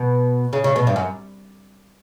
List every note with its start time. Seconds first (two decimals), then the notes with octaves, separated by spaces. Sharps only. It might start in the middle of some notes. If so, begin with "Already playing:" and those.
Already playing: B2
0.53 C#3
0.64 C#3
0.76 B2
0.87 G2
0.96 F#2